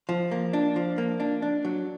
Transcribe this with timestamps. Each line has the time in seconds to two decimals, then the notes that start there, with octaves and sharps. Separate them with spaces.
0.09 F3
0.31 A#3
0.53 D4
0.76 F3
0.98 A#3
1.20 D4
1.42 D4
1.65 F#3